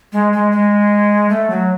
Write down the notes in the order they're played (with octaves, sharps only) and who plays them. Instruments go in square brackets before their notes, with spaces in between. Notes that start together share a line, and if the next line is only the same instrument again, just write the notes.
[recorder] G#3
G#3
G#3
A3
F#3